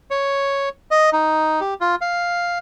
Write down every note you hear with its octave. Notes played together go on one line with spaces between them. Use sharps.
C#5
D#5
D#4
G4
F4
F5